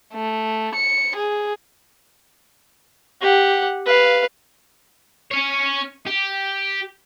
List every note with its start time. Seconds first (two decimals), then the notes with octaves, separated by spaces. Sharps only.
0.13 A3
0.75 C#7
1.17 G#4
3.21 G4 F#5
3.86 B4 F5
5.31 C#4 C#5
6.07 G4